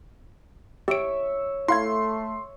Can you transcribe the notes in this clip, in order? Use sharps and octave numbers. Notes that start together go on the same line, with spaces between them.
G4 C#5 E5 D7
A3 E4 F5 C6 G#6